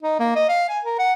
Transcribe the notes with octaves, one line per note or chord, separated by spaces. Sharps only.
D#4
A#3
D#5
F5
G#5
A#4
F#5